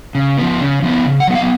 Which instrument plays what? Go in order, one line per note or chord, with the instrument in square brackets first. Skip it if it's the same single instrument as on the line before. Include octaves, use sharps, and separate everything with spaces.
[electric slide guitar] C#3
F3 B3
C#3
F3 B3
C#3
F#5
F#3 B3
F5